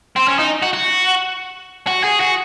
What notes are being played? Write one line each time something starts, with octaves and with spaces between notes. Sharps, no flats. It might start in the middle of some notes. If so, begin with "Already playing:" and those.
C4
C#4
D#4
F#4
F#4
F#4
G#4
F#4